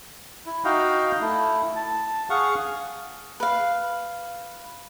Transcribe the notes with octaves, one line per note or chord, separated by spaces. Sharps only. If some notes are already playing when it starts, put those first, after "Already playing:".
E4
D#4 F#4 D#5 F5 G5
A3 E4
A5
G#4 F5 F#5 C#6
B4 F5